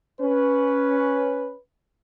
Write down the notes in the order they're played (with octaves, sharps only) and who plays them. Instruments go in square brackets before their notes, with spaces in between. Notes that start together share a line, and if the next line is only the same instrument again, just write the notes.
[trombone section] C#4 B4